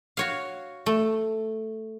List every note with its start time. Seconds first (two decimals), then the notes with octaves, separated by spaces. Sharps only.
0.17 F#4 C#5 F5
0.86 A3